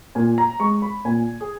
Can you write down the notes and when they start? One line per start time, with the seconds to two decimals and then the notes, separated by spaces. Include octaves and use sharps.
0.15 A#2 G#5
0.38 A#5
0.60 G#3 C#6
0.82 B5
1.05 A#2 G#5
1.41 G#4